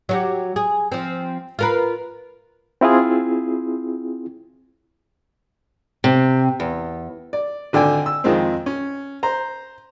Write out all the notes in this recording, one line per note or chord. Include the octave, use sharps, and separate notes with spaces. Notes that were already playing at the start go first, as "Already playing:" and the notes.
F#3 F#4 G4
G#4
F3 C4
F4 A#4 B4
C4 E4 F4 G#4
C3
E2
D5
G#1 D3 D5 G5 G#5
E6
F2 D#3 F3 G#3 C4
C#4
C5 A#5